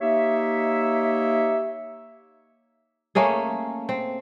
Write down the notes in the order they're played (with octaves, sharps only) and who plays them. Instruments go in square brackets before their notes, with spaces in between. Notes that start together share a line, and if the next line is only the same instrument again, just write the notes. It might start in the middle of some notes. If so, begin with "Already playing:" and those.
[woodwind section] A#3 D#4 G4 C#5 E5
[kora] A3 A#3 C#4 G#4
C4